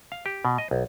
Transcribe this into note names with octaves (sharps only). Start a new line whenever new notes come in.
F5
G4
B2
D#5
B1